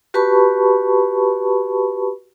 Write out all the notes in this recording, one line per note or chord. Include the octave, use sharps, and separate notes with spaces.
F#4 G4 B4 A5 B5 C#6